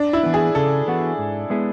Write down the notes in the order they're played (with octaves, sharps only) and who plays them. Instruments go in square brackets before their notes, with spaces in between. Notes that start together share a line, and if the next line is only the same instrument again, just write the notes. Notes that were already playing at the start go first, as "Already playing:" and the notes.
Already playing: [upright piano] D4
E4
[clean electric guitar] E3 B3
[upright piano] G#4
[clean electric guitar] C#3 [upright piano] A4
[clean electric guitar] E3 B3 F#4
G#2
G#3 B3 E4 G#4